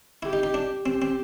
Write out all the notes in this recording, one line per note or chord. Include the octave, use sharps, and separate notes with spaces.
E4 G4
D#4
D#4
D4
C4 G4
C4